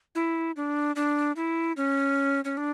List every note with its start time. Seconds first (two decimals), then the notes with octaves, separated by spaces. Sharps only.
0.15 E4
0.56 D4
0.96 D4
1.36 E4
1.77 C#4
2.45 C#4
2.57 D4